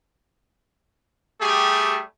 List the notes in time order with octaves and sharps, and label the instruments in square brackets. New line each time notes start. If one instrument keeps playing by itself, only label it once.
[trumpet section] G3 A3 G4 G#4